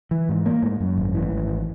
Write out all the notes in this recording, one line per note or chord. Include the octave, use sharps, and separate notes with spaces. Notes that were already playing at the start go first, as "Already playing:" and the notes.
E3
G#2
A#3
G#2
F#2
G#1
E3
G#1